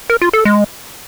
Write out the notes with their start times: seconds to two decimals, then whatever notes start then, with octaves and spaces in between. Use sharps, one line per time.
0.10 A#4
0.22 F4
0.33 A4
0.45 G#3